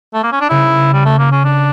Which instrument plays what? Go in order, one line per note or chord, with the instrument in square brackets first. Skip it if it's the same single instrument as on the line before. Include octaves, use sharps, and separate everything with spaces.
[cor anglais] A3
A#3
C#4
D4
[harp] C#3 [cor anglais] E4
[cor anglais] G3
A3
A#3
C#4
D4